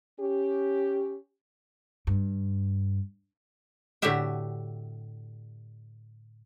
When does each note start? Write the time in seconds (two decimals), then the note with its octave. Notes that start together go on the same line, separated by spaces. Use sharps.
0.20 C#4 G4
2.07 G2
4.02 A2 D3 F#4 G4 E5 G5